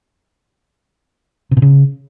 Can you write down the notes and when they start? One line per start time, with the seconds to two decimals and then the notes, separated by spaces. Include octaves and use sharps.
1.51 C3
1.57 B2
1.62 C#3